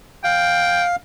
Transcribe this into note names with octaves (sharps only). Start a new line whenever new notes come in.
F5 G5